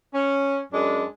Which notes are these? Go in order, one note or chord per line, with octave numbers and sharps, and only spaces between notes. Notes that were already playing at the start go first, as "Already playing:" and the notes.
C#4
F#2 G#3 D4